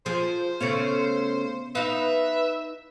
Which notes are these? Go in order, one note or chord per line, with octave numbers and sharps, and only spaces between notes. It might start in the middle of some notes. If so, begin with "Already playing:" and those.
F3 G#4 C5
C#3 A3 B3 C#4 C#7
D#4 B4 E5 F5